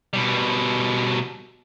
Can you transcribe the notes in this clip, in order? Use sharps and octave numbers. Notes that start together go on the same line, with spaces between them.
B2 G3